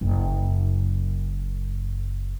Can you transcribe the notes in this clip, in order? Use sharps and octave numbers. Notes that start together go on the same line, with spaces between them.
F#1 F#2